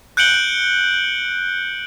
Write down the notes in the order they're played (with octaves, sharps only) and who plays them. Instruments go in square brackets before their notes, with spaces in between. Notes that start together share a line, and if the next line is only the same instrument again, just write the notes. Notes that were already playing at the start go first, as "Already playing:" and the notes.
[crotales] F#6 G6 C#7 D7 F#7 G7